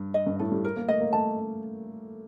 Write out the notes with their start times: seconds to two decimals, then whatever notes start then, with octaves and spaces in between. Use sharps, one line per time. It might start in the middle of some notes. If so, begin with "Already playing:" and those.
Already playing: G2
0.14 D#5
0.27 G2
0.39 A2 A4
0.52 G3
0.65 A#4
0.76 A#3
0.88 A3 D#5
1.00 A#3
1.13 A3 A5